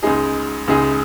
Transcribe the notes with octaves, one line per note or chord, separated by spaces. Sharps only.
C#2 C#3 G#3 D#4 G#4
C#2 C#3 G#3 D#4 G#4